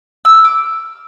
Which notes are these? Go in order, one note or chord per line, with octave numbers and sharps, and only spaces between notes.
E6
F6
D6